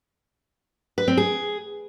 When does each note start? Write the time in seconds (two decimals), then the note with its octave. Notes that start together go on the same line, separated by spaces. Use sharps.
0.98 B4
1.08 C4
1.17 G#4